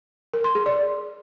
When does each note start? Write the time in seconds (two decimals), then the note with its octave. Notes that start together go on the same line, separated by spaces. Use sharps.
0.34 A#4
0.44 C6
0.55 G#4
0.66 D5